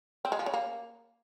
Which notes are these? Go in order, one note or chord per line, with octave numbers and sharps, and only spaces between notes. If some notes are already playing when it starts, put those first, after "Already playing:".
C4
G#3
F3
C#3
A#3